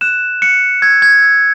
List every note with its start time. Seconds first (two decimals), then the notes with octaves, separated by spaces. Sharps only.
0.01 F#6 E7
0.42 F#6 C#7
0.82 E6 G#6
1.02 G#6
1.22 E6